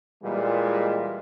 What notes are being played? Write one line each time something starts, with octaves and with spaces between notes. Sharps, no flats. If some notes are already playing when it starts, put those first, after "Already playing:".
A#2 E3 G3 G#3